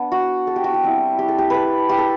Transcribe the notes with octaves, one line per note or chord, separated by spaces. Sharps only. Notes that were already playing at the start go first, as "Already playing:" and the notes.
Already playing: B3 D4
F#4
A4
G4
F#4
G4
G3 C4 E4
G4
A4
G4
A4 B4
G4
A4